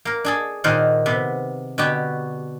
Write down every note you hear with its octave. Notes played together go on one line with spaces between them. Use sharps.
A#3 A#4
D4 G#4 A4
A#2 D#3 C5 F5 F#5
C3 B3
B2 D3 F#4 G4